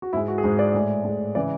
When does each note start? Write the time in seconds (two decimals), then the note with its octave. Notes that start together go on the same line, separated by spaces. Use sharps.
0.02 F#4
0.13 G#2 G#3 E4
0.28 F#4
0.38 G#4
0.43 G#2 G#3 F#4
0.59 D5
0.74 A2 G#3
1.04 A2 G#3
1.35 C#3 E3 D5